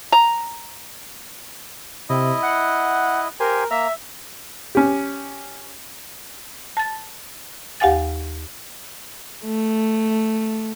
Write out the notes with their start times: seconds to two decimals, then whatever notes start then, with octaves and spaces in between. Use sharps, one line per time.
0.12 A#5
2.09 C3 E4 D#5
2.43 F#5
3.40 G4 A#4 C5 G#5
3.71 A#3 E5 A#5
4.75 C#4 G4
6.77 A5 A6
7.80 D#2 G4 F5 F#5 G#5 A6
9.45 A3